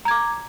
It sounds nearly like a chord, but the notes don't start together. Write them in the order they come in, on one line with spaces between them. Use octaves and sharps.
A#5 G#6 D6